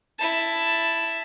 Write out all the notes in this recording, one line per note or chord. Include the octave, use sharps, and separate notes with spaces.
E4 A5